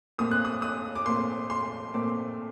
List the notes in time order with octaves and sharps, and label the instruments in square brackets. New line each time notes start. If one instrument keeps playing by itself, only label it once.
[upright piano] A#2 A3 C4 D#6
F#6
D#6
D#6
D6
A#2 A3 C4 C6
C6
A#2 A3 C4 D6